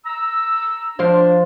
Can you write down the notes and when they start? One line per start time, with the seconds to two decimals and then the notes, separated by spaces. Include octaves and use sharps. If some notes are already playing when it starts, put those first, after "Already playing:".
0.05 A#5 E6
0.99 F3 D4 C5 F5